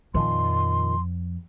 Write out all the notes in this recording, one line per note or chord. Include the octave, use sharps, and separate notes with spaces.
F2 A#2 D#3 F3 C6